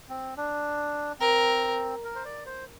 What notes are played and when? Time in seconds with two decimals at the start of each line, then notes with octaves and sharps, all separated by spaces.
0.09 C4
0.37 D4
1.20 C4 A#4
2.05 A#4
2.15 C5
2.25 D5
2.46 C5